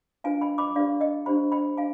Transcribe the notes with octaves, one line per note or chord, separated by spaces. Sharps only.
D4 F4 B4 F5 G#5
G5 B5
B5 D6
D4 G4 B4 D5 F5
D#5 G5
D4 G4 C5 G5 B5
G5 B5
D4 F5 G#5